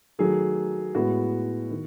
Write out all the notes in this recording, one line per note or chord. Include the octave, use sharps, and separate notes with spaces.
D#3 F#3 A3 G#4
A2 G#3 B3 F#4
D#3